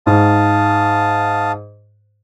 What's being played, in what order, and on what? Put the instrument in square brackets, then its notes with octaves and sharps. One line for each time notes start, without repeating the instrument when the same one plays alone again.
[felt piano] G#2 [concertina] F5 A5 D#6